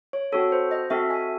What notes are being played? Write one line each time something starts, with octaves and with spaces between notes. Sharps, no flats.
C#5
C4 F#4 A4 C#5
C5
D#5
C4 F#4 A4 E5
G#5